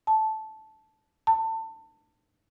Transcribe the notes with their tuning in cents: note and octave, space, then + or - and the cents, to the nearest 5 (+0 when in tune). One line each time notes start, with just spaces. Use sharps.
A5 -10
A5 +25